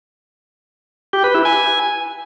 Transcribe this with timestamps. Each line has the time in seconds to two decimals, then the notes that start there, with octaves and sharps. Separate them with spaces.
1.13 G4
1.24 B4
1.35 E4
1.45 G#5